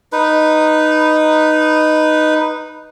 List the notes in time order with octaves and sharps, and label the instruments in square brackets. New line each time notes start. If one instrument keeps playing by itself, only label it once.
[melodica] D#4 B4